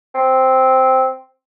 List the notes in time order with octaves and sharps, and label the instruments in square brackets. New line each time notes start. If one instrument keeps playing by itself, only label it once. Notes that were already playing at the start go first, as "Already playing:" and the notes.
[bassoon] C4